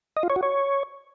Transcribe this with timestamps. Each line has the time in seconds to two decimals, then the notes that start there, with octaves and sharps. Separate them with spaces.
0.17 D#5
0.23 F4
0.30 C#5
0.36 F#4
0.43 C#5